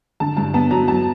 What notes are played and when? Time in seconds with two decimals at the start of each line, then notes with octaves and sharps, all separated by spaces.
0.20 D3 A5
0.37 G2 A5
0.54 B3 A5
0.71 F#3 A#5
0.88 F#3 A5